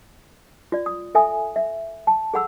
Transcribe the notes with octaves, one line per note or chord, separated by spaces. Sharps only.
F4 D5
D#6
A4 E5 G#5 D#6
E5
A5
G#4 A4 F#5 B5 E6